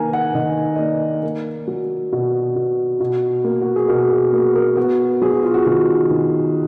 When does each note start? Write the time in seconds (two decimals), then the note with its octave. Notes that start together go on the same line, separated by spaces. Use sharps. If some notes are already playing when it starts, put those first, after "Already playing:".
Already playing: D#3 A#3 G#5 A#5
0.13 F#5
0.34 D#3 D#5
0.75 D#5
0.79 A#3 D5
1.23 A#3
1.67 F#3
2.13 B2
2.56 B2
3.00 B2
3.44 A#3
3.62 F#4
3.76 G#4
3.88 B2 A#4
4.11 G#4
4.33 A#3 F#4
4.55 A#4
4.77 B3 F#4
5.22 F#3 G#4
5.32 F#4
5.43 F4
5.54 F#4
5.66 D#3 F#4
6.10 D#3